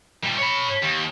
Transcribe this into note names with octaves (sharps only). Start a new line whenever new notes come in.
A#2 G3
C#5 B5
D#2